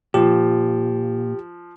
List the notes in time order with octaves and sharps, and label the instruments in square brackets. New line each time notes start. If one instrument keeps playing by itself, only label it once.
[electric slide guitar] A#2 [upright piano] F3 [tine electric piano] G4